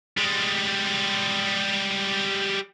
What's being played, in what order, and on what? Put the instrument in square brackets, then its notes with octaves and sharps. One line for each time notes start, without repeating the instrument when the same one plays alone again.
[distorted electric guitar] G3 G#3